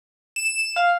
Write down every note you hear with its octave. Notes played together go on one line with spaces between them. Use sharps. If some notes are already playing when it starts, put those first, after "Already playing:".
E7
F5